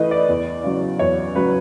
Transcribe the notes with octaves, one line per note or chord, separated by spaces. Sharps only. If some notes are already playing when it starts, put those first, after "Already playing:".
Already playing: A2 E3 A3 B4 D#5
D5
E2
C#3 F#3
E2 C#5
C#3 F#3 B4